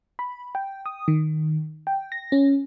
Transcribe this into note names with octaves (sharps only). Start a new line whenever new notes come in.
B5
G5
D#6
D#3
G5
A#6
C#4